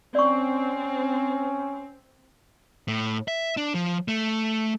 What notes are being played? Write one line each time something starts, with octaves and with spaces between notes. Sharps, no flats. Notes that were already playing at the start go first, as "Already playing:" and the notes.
C4 C#4 D5 C#6
A2
E5
D4
F3
A3